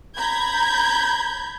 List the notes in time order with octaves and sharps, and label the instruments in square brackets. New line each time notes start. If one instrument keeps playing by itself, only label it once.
[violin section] A#5 B5 G6 G#6